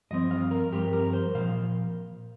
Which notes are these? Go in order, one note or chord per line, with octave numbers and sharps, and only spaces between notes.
G2 F3 C4 D#5
F5
A#4
G2 F3 C4 G4
A#4
C5
A#2 F3 F5